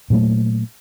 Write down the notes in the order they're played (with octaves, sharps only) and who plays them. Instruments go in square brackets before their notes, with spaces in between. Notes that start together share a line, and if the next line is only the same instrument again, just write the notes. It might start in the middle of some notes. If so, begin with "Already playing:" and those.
[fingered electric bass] A#2 F#3 A3